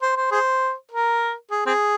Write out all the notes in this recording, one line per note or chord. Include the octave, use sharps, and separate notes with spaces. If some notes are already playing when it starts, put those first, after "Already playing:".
C5
C5
G#4 C5
A#4
G#4
C4 G#4